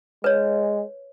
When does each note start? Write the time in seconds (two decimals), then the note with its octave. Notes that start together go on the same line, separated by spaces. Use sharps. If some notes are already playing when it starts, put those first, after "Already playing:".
0.24 G#3 B4 C#5